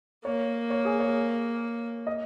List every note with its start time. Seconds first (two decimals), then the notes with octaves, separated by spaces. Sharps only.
0.25 A#3 C#5
0.70 C#5
0.85 G#4
1.00 C#5
2.07 D#5